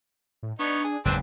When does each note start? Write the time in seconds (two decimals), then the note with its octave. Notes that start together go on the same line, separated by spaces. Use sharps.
0.43 A2
0.59 B3 D4 D#4 C#5
0.84 G#4
1.05 F#1 E2 G#2 C4 D4 B4